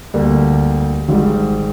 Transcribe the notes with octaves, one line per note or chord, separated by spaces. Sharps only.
D2 D3 G3 A#3
G#1 G#2 G3